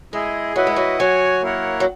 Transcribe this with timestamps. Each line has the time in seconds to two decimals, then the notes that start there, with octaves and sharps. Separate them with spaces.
0.13 G#3 E4 G#4 D#5
0.56 F#3 E4 B4 D#5 F#5
0.67 G#3
0.76 F#3
0.99 F#3 F#4 C#5 G#5
1.42 A#3 E4 A#4 C#5 F#5
1.80 F#3